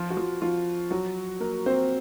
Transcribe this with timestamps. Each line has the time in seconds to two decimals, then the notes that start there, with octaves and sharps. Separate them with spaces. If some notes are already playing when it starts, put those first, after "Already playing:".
Already playing: F3 F4
0.10 F#4
0.17 F3 F4
0.42 F3 F4
0.91 F#3 F#4
1.40 A#3 A#4
1.66 C4 C5